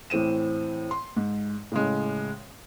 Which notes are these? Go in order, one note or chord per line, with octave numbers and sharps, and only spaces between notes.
A2 E3 C4 D#7 E7
C6
G#2
A2 C#3 G#3